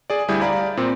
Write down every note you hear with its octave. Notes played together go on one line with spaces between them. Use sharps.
G#4 D5
D2 G3 E4 G#4 G6
D5 F5 A#5 B5
A#2 C4